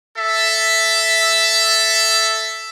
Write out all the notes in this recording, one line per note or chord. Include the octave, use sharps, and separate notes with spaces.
A4 E5